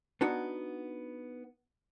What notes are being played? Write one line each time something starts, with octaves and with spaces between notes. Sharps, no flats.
B3 D4 D#4 F#4